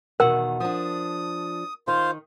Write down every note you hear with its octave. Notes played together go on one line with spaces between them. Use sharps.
E2 B2 D#3 A#4 F#5
F3 D4 D#6
D#3 F4 C5